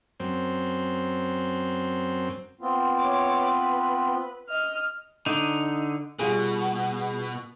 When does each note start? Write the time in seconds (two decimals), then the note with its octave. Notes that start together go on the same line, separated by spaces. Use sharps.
0.20 F#2 C4
2.61 B3 C4 F4
3.00 C#5 D6
3.45 B4
4.49 D#5 F6
5.26 D3 D#4
6.19 B2 G3 F4 G#4